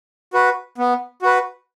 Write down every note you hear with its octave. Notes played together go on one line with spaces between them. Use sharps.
F#4 B4
B3
F#4 B4